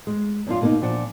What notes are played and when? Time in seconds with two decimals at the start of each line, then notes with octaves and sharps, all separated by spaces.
0.07 G#3
0.47 F#2 D4 F4
0.61 B2 A#3 D#4
0.82 A#2 F3 D4 F#5